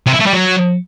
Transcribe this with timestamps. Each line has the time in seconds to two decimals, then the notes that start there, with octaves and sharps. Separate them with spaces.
0.06 C3
0.13 E4
0.20 A3
0.26 G3
0.33 F#3